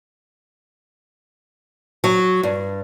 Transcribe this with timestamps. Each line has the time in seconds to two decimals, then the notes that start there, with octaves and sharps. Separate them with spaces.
2.04 F#3
2.43 G2